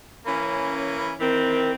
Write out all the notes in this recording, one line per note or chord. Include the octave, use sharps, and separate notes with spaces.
E3 A#3 C#4 B5
B5
D#3 E3 C4 A#4